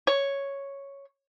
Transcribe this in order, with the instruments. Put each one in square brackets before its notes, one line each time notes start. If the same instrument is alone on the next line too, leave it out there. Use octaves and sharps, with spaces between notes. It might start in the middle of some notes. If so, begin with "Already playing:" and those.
[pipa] C#5